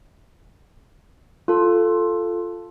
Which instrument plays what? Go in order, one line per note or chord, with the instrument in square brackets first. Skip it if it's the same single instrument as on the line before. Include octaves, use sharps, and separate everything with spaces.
[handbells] F4 A4